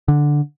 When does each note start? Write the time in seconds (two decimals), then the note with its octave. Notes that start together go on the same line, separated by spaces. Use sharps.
0.08 D3